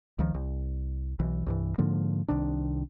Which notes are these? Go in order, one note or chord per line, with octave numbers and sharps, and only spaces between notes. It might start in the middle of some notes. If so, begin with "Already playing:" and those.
C#2 D#3 F3
C2
B1 E3
C2 G2 E3
G#2 D3 F3 A#3
C2 C3 D#3 D4